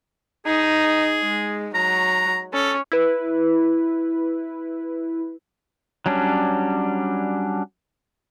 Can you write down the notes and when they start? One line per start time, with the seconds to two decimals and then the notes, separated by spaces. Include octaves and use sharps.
0.46 D#4 G#4
1.22 G#3
1.74 F#3 A#5
2.54 C#4 A4
2.92 E4 B4
6.06 F#3 G3 C#4 D4